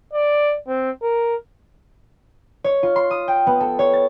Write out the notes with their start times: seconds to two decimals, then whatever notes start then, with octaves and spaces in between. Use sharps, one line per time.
0.13 D5
0.67 C4
1.02 A#4
2.64 C#5
2.83 F4
2.96 C6
3.11 D#6
3.28 G5
3.47 B3
3.60 A4
3.79 C#5
3.93 A6